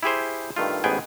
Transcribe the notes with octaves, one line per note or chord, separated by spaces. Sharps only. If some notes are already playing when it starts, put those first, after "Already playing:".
E4 G4 G#4 C5
G2 D#3 A3 F4
A1 G#2 B3 G#4 G5 G#5